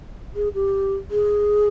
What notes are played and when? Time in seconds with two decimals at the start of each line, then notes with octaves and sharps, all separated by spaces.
0.36 G#4
0.55 G4
1.11 G#4